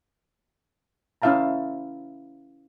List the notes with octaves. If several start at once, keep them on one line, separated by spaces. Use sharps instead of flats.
C#4 E4 E5 F5 A5 A#5